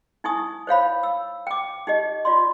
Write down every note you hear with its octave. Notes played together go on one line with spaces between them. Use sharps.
D#4 E4 G#5 C#6 D#6
C5 C#5 F5 B5
E6
G5 D6
D#4 G4 D#5
F4 D5 C6